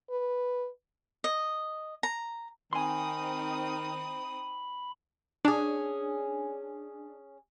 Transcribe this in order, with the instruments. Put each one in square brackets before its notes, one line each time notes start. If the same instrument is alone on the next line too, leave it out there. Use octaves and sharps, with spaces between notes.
[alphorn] B4
[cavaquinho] D#5
A#5
[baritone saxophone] D#3 [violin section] C4 D#4 D#6 [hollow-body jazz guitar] G#5 C6 [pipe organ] B5
[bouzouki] C#4 G#4 [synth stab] D4